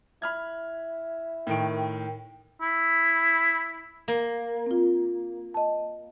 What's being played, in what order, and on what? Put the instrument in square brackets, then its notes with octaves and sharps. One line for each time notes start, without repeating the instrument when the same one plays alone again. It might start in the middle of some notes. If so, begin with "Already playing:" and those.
[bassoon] E4 [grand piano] B5 F6 G#6
[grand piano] A2 D#3 D7 [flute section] A#4 G5
[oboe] E4
[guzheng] A#3
[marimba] C4 F4
D#5 A5